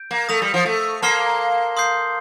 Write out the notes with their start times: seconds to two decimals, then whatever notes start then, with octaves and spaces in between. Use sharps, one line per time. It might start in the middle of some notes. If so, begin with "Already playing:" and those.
Already playing: G6 D7
0.11 A#3
0.29 A3 D#6 A#6 F7
0.42 G3
0.54 F3
0.66 A3
1.02 A#3 A5 C6 F6 C7 G7
1.77 C6 D#6 G6 C7